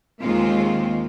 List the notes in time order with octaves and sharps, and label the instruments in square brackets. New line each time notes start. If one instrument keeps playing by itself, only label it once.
[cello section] D#2 D#3 G#3 A#3 C4 F4